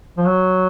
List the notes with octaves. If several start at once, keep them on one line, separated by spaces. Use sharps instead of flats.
F3
F#3